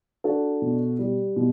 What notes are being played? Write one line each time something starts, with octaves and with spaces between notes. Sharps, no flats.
D4 F#4 A4
B2
G3
B2